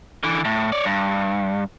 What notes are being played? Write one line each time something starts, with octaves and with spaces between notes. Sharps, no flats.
D3 E3
A2
C#5 D5
G2